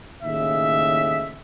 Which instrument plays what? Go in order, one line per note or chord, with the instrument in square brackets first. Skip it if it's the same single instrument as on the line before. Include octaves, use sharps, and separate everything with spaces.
[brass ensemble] D#2 A2 C#3 D#5 E5